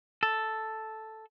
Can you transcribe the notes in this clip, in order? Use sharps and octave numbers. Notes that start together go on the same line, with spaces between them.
A4